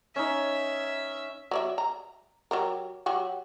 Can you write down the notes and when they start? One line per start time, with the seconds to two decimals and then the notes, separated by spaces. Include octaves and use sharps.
0.16 C#4 D#4 E5
1.51 F#3 D5 E5
1.78 A#5
2.51 F#3 G4 A#4
3.06 F#3 F#4 G4